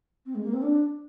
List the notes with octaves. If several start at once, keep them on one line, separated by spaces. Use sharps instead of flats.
C4
G#3
A#3
C4
D4